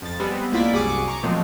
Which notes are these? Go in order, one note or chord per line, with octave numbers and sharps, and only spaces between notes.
F2 A6
G3 G#3 B3 C4
C#2 A#3 E4 F4 D5 B6
C2 F#2 F#4 G#4 D6 C#7
A#5 C#6 D6
A#2 F3 F#3 G#3 A3 C4